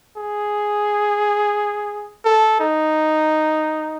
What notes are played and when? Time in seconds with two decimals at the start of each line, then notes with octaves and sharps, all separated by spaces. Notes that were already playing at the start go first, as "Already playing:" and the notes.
0.18 G#4
2.25 A4
2.60 D#4